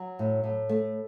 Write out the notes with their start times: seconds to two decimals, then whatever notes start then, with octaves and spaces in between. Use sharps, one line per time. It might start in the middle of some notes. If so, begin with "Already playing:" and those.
Already playing: F#3
0.19 A2
0.44 A2
0.69 A3